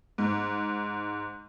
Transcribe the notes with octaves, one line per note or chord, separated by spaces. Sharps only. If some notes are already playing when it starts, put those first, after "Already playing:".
G#2